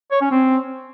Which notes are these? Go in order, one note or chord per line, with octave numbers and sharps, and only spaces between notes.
C#5
C#4
C4